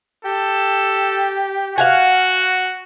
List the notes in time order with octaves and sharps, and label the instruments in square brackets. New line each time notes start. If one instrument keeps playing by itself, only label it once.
[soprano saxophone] G4 [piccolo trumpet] A4
[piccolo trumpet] F#4 [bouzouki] F5 F#5 G#5